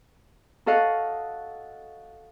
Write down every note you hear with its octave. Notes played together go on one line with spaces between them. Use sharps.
F#4 A4 D#5 F5 F#5